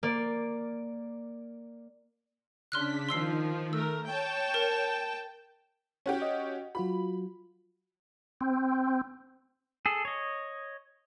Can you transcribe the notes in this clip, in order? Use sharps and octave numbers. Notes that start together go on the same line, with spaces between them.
A#3 D5
C#3 D4 C6 F6 F#6 B6
D#3 F3 C6 E6 C7
A3 A#4 E6
C#5 G5 A5
A#4
C#4 F#4 G4
D#5
F#3 F4 F#4 B5
C4
G#4 A4
C#5 D#5